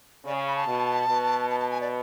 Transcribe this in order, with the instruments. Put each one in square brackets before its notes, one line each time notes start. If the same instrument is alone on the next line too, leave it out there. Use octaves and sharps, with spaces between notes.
[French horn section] C#3 [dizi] D5
[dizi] G#5
B5
A5
[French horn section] B2
B2
[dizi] A5
A5
G#5
D5